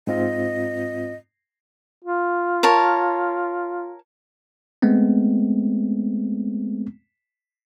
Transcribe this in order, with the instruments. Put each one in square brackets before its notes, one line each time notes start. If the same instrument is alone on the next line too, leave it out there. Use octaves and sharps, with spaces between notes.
[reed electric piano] G#2 C4 F4 [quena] D#5
[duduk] F4
[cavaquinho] A#4 C#5 A5
[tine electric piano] G#3 A3 B3 C4